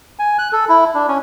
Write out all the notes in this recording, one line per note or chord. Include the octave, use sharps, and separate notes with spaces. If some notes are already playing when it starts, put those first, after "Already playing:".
G#5
F#6
A4
E4
D4
C#4